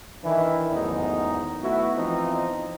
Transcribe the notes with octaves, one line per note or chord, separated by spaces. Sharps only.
D#3 E3 D4 E4
A1 E2 G#2 D#3 F#3 D#4
A3 B3 E4 F#4
E3 F3 B3 C4 D#4